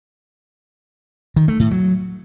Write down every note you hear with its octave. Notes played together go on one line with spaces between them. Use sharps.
D#3
A3
A2
F#3